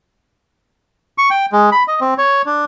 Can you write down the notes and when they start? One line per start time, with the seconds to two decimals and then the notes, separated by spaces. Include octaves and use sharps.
1.18 C#6
1.30 G5
1.52 G#3
1.72 B5
1.88 D#5
2.01 C4
2.18 C#5
2.46 D4